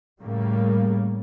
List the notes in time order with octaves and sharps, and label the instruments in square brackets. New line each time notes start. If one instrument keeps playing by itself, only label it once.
[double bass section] A2 C#3 G3 A#3